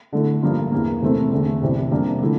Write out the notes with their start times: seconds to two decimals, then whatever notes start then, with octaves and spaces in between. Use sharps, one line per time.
0.13 D3 A3 E4
0.43 G2 F3 A#3 F4
0.72 E2 E3 A#3
1.02 C3 E3 A3 C4
1.32 E2 D3 A3
1.61 C2 C3 E3
1.91 F2 C3 G3 A#3 D4
2.21 D3 F3 A3 E4